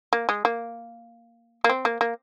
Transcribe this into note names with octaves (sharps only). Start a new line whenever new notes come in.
A#3
G#3
A#3
A#3
C4
A#3
A#3